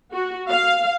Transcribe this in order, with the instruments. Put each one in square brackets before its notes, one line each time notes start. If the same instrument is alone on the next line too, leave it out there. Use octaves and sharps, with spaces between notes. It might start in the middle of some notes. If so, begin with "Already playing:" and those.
[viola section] F#4
F5